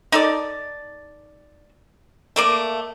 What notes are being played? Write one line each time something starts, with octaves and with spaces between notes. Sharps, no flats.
D#4 A4 D5
A3 A#3 D5